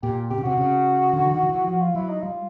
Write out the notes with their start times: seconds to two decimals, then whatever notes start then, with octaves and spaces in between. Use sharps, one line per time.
0.03 A#2 G4
0.30 C3 G4
0.38 C#3
0.44 C3 F#4
0.58 C#3
1.13 D3
1.26 E3
1.31 D#3
1.43 D#3
1.49 E3
1.68 F3 F#4
1.81 F4
1.95 F#3 E4
2.09 D#4
2.23 G3 F4